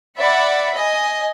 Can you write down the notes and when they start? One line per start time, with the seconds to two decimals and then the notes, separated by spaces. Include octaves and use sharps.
0.20 D5 E5 F#5 B5
0.76 D#5 G#5